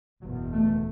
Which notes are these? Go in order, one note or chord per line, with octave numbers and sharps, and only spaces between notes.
F#1 E2 B2 F#3
A3